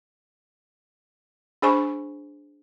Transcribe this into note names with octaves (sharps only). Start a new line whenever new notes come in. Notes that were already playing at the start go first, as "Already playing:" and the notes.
D4 G#4 C5 G#5 B5 C#6